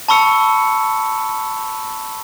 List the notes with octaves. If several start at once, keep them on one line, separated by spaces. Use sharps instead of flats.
A5 B5 C#6 E6 C#7